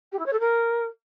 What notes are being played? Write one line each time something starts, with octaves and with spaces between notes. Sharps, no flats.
G4
E4
C#5
A4
A#4